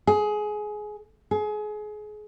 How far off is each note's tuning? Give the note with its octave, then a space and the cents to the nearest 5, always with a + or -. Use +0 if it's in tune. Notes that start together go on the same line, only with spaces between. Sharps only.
G#4 +20
G#4 +30